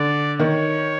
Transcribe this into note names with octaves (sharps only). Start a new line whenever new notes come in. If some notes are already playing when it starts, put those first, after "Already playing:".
Already playing: D3 D5
D#3 C#5